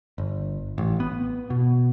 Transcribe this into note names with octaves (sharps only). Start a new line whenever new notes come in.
G1
A1
B3
B2